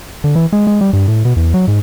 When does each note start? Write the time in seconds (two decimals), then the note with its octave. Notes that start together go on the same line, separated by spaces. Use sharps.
0.24 D3
0.35 E3
0.53 G#3
0.67 G#3
0.81 G3
0.93 G2
1.08 A2
1.25 B2
1.36 E2
1.54 F#3
1.68 G#2